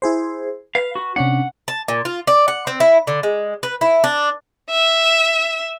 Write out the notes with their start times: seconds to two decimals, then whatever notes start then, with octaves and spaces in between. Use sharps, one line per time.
0.02 E4 G#4 C5
0.75 B4 F5
0.95 F#4
1.16 C3 C#4 D4 F#5
1.68 A5
1.88 A#2
2.05 F4
2.27 D5
2.48 F#5
2.67 C4
2.80 E4
3.07 D3
3.23 G#3
3.63 B4
3.81 E4
4.04 D4
4.70 E5